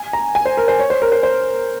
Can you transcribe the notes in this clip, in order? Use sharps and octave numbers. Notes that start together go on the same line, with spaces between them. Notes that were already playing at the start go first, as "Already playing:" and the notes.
Already playing: G#5
A#5
G#5
C5
A#4
C5
C#5
C5
A#4
C5
C5